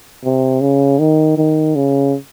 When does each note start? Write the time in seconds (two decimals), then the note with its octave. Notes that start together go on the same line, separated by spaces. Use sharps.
0.24 C3
0.61 C#3
0.99 D#3
1.38 D#3
1.76 C#3